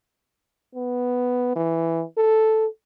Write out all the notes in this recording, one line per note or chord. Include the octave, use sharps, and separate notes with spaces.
B3
E3
A4